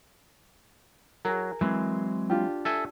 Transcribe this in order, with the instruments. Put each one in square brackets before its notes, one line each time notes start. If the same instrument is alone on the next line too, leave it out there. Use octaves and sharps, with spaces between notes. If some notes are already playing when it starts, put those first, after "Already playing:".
[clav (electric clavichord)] F#3 [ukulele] G#4 A#4
[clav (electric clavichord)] E3 [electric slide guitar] F#3 G#3 C4
[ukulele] D4 F4 G4
[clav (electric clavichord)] A4 E5 G#5